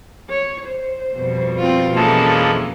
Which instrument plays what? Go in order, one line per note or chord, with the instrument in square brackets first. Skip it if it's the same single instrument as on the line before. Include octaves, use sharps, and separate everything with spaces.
[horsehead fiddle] C#5
C5
[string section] F2 B2 G3
[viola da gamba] C4 F4
[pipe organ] E3 F3 G#3 [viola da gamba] A#3 C#4 [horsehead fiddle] A4 A5